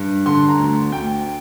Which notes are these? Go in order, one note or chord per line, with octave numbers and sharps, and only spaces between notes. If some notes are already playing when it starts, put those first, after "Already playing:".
Already playing: G2
D3 C6
A#5
D2
D2 G5